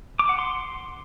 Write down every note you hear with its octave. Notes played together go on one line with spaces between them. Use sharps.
D6
F#5
C6